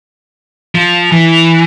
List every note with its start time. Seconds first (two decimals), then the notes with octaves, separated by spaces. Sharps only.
0.75 F3
1.12 E3